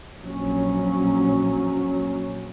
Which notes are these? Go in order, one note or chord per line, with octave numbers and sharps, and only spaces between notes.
A#1 F#3 C#4